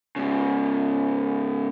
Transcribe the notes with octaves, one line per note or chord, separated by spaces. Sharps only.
G#2 C#3